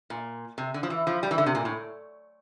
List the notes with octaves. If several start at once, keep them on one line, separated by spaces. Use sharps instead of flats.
A#2
C3
D3
F3
E3
F3
G3
E3
D3
C3
A#2
A2